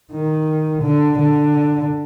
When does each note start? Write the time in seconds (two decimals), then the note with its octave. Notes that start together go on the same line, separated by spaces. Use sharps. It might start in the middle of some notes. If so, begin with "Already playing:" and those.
0.12 D#3
0.82 D3
1.18 D3